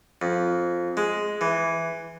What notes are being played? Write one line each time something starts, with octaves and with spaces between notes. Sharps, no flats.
F2
G#3
E3